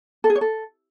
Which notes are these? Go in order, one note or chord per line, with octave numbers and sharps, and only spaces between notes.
A4
G#4
C#5
A4